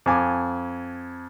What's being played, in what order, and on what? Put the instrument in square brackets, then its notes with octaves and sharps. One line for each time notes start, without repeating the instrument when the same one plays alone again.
[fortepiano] F2 G#5 D6